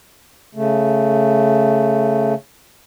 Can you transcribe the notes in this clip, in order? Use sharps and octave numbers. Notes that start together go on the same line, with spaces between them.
C#3 A3